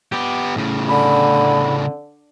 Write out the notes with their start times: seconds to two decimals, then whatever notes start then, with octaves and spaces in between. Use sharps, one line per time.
0.12 B3 G4
0.56 A2 C#3
0.89 D3 B5